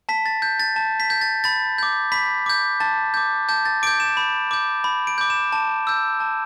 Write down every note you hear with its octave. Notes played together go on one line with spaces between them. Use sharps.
A5 B6
A6
G6
A6
A5
B6
G6
A6
B5 A6
D6 G6
B5 B6
D6 G6
A5 A6
D6 G6
A5 G6
A6
D6 G6 D7
E7
B5
D6 G6
B5
D7
D6 G6
E7
A5
E6 G6
A5